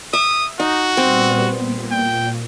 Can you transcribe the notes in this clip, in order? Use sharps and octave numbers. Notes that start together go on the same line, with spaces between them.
E5 D#6
D#4 F#4
A#2 G3 B3 C4
A#2
G5